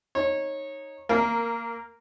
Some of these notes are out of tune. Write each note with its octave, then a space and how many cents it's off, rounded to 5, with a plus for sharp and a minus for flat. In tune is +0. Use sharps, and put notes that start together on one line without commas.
D#4 +0 C#5 -20
A#3 -10 A#4 +0 F5 -35